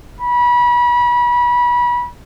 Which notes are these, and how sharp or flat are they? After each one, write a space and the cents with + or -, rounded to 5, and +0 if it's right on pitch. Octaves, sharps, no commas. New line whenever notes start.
B5 -30